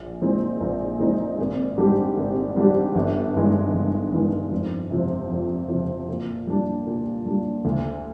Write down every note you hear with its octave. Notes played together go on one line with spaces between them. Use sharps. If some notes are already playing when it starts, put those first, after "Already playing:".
Already playing: A#1
A#2 G#3 C4 D#4
A#1
A#2 G#3 C4 D#4
G#1
G#2 G3 D4 G4
G#1
G#2 G3 D4 G4
G1
G2 D#3 G#3
G1
G2 D#3 G#3
F2
C3 F3 C4
F2
C3 F3 C4
A#2
G3 D4
A#2
G3 D4
D2